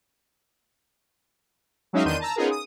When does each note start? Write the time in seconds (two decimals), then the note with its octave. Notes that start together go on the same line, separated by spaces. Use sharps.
1.93 F#3 G#3 C#4 D#4 E5 F5
2.05 E2 D#3 D4 C6 G6 D#7
2.20 A5 A#5 E6
2.36 B3 C#4 D#4 F4 G#4 A#4
2.51 D#6